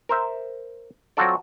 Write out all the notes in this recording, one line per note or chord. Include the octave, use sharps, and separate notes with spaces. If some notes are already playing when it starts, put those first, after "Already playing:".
A#4 C5 E5
F#3 C4 F4 F#4 A4 D5